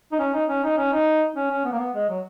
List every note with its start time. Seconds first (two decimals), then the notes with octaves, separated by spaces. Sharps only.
0.12 D#4
0.19 C#4
0.33 D#4
0.49 C#4
0.63 D#4
0.77 C#4
0.92 D#4
1.36 C#4
1.50 C#4
1.65 B3
1.72 A#3
1.79 B3
1.95 G#3
2.09 F#3